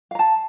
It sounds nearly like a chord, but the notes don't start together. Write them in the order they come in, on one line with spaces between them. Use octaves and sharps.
F5 A#5 A5